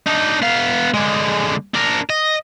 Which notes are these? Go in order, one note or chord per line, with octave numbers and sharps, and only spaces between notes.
D4 D#4
B3 F5
D3 G#3
D4 A#4
D#5